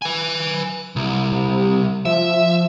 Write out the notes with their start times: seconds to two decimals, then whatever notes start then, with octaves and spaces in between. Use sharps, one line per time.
0.02 B4 G#5
0.96 C2
1.32 C3
2.05 F3 E5